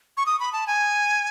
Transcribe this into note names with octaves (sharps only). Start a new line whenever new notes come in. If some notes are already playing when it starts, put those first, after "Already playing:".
C#6
D#6
B5
A5
G#5